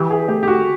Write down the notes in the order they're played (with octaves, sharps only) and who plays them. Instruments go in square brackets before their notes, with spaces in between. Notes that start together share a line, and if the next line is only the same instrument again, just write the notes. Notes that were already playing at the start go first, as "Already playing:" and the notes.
Already playing: [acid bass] E3 [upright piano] G4
[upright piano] G#4
[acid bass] A3 [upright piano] G4
[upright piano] G4
F#4